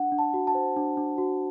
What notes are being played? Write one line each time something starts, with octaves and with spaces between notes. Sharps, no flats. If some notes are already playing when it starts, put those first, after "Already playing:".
Already playing: D4 F#5
D4
A5
F#4
A5
C5
D4
D4
F#4